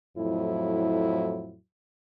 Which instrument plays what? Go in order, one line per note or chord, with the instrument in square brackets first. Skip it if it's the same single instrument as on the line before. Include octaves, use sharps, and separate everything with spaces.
[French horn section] F2 A2 F#3 E4